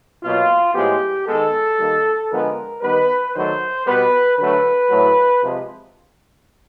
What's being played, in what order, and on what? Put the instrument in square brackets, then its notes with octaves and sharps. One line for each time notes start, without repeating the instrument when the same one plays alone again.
[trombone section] B2 F#3 A#3 F4
A2 F3 G#3 B3 G4
D#3 G#3 B3 A4
D#3 G3 A#3
D3 F3 G#3 B3 A#4
D#3 G3 B3 B4
D#3 F#3 A3 C5
B2 G3 B3 B4
D3 F#3 A3 B4
A2 F#3 A3
C3 F3 G#3